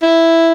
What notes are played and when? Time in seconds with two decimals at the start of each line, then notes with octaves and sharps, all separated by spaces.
0.03 E4